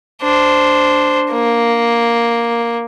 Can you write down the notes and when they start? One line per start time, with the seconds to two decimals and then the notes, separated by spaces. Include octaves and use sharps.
0.22 D4 C5
1.31 A#3